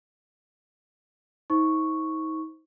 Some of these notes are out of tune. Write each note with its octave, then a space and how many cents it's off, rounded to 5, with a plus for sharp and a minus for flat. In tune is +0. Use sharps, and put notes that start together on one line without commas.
D#4 +35 C5 +0 C#6 +0